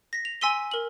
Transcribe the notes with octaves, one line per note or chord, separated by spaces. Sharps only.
A#6 B6
F7
G#5 C6 E6 B6 D#7 G7
A#4 F#7